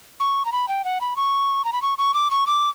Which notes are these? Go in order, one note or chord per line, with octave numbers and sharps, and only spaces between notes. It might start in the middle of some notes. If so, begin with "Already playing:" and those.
C#6
A#5
B5
G5
F#5
B5
C#6
A#5
B5
C#6
C#6
D6
C#6
D6